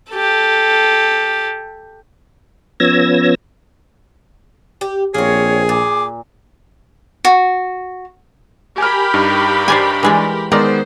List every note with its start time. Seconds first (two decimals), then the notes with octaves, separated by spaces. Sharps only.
0.12 G4 A4
2.80 F3 B3 C#4 E6 G#6 A#6
4.81 G4
5.14 A#1 A#3 C4 G#4 C#5
5.69 A#2 D6
7.25 F#4
8.78 G4 A#4 G#5 B5 F6
9.14 G2 D#4
9.68 C5 D5 G#5
10.03 E3 G#3 D5
10.52 D#3 G#3 B3 A#4 C5 D5 D#5